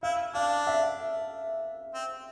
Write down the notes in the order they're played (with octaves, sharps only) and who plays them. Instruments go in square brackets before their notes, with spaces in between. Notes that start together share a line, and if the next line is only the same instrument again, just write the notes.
[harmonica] E4 [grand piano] F5
[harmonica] D4 [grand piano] F5
[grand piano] E5
[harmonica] C4